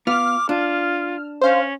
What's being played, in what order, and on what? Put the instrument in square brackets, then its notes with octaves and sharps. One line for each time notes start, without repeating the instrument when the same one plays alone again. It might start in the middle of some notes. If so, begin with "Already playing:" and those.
[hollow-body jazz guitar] B3 F4 [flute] D6 [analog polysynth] F6
[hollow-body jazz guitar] D4 [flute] F4
[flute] C#4 [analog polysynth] C5 F5